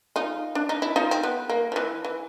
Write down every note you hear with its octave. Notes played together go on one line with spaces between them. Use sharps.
D#4 F4
D4
D#4
E4
D#4 F4
C4
B3
A#3
F3
E3
E3